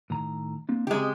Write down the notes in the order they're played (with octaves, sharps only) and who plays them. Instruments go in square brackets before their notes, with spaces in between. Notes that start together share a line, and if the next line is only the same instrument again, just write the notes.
[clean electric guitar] A2 D#3 A#5
A#3 C4 D4
[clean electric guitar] C#3 C4 [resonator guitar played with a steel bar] G#3 G4